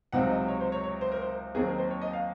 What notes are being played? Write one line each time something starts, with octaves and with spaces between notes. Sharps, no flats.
C#2 C3 F#3 C4 D#4 F#5
D#5
C#5
C5
C#5
C#5
C5
A#4
C5
D#2 D#3 F#3 C4 D#4 G#4
A#4
C5
C#5
D#5
F5